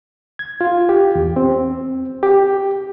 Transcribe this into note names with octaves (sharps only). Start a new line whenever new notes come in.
G#6
F4
G4
E2
C4
G4